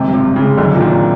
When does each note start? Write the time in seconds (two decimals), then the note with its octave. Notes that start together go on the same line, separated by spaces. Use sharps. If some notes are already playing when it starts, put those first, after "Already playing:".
Already playing: G#1 C3
0.08 G2
0.14 C3
0.25 G2
0.36 C#3
0.41 G#3
0.57 B1 D3
0.75 A#2
0.80 D#3
0.91 A#2